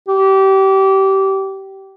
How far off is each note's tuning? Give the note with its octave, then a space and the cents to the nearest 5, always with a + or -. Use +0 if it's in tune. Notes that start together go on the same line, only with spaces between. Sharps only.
G4 -25